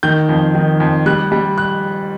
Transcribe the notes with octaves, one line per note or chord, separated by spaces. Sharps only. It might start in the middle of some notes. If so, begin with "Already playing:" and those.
D#3 G6
F2
D#3
F2
G3 F#6
G3
F#6